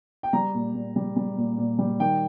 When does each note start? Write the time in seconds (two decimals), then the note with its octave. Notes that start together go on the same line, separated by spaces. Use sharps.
0.23 G5
0.33 G3 A#5
0.54 A#2
0.75 A#2
0.96 G3
1.16 G3
1.37 A#2
1.58 A#2
1.79 G3
2.00 D#3 G5